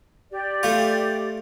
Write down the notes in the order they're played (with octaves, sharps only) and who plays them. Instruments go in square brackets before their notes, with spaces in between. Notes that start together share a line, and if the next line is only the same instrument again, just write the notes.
[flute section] G4 D5
[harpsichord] A3 F4